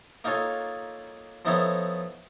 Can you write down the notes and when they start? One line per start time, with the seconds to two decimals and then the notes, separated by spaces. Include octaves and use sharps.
0.24 A#3 D#4 F4 A4 C#5 G#5
1.45 F3 B3 D#4 E4 A4 C#5